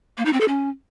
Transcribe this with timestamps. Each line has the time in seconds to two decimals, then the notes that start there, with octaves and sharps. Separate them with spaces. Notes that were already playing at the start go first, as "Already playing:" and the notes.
0.18 A#3
0.25 D#4
0.33 C4
0.41 A4
0.48 C#4